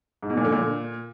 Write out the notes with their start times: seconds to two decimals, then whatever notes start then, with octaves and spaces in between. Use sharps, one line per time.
0.23 G#2
0.30 B2
0.37 A#2
0.45 D3
0.52 A#2